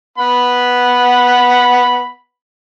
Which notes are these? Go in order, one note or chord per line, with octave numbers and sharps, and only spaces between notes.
B3 F#5 B5